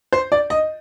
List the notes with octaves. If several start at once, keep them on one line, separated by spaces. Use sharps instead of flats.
C5
D5
D#5